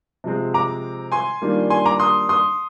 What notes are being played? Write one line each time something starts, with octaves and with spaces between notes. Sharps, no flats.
C3 F3 G#3 C4
A#5 D6
G#5 C6
D#3 G3 A#3 D4 F4
G#5 C6
A#5 D6
C6 D#6
C6 D#6